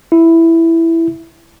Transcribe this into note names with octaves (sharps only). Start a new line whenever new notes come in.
E4